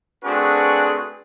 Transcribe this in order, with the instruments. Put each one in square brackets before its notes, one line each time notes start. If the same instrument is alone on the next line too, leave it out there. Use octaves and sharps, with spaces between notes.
[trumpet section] A3 C4 D4 F#4 G#4 B4